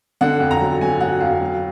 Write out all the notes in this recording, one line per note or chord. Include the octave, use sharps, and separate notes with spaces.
D3 F#5
F2
A#5
F#3
F#3 G#5
F#3 F#5
F2 F5
F#3